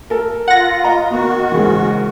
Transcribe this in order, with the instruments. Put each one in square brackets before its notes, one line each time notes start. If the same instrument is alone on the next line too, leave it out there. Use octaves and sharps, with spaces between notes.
[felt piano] A4 A#4
[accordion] F4 [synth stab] F#5 A#6
[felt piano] D#5 A#5
[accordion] D#3 F#4 [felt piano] B3
[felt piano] G#2 C#3 E3